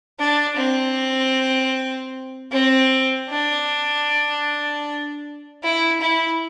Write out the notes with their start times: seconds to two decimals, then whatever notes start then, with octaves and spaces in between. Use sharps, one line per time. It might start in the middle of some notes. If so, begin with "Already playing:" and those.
0.19 D4
0.57 C4
2.52 C4
3.30 D4
5.63 E4
6.01 E4